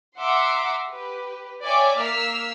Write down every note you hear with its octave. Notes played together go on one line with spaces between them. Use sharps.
E5 F#5 A#5 C6 D6 E6
G4 B4
C#5 D5 E5 G5 G#5 D6
A#3 E6 F6 B6